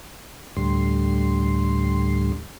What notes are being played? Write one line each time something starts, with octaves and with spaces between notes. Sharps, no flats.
D2 A2 D3 G3 C6